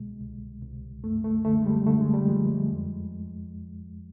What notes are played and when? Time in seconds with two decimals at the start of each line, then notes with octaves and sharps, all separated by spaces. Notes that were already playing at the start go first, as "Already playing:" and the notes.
Already playing: C2 B2 G#3
0.20 C2
0.62 C2
1.04 F#2 A3
1.24 A3
1.45 D3 A3
1.62 G#3
1.66 G3
1.86 D3 A3
2.00 G#3
2.14 G3
2.28 F3 G#3
2.71 F2